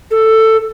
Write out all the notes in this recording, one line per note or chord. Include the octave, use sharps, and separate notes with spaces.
A4